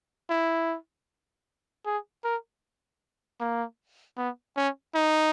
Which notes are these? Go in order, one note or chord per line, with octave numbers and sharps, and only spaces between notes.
E4
G#4
A#4
A#3
B3
C#4
D#4